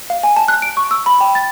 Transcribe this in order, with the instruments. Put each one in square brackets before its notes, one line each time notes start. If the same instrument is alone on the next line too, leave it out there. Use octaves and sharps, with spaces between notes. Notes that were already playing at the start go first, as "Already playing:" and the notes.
[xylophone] F5
G#5
A5
F#6
D7
C#6
E6
B5
G5
A6